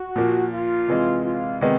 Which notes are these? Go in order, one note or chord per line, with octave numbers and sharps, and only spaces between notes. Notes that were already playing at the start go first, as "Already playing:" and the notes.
Already playing: F#4
A#2 F3 A#3
F4
C3 E3 G#3
F4
C3 D#3 G#3 B3